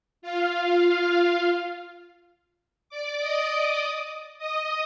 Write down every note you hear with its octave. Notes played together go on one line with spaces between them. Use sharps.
F4 F5
D5 D6
D#5 D#6
D#5 D#6